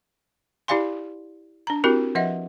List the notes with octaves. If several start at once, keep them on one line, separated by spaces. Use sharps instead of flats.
E4 G4 D5 F5 G#5 C6
D4 A#5
C4 E4 F#4 G4 A#4
F3 D#5 E5 F#5